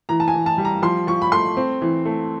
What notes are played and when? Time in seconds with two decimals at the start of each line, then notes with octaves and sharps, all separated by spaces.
0.09 E3 A#5
0.20 A5
0.28 G#5
0.34 E3
0.46 A5
0.58 G3
0.65 A#5
0.82 F3 C6
1.07 F3 C#6
1.22 B5
1.32 A3 C6
1.57 C4
1.82 E3
2.05 A3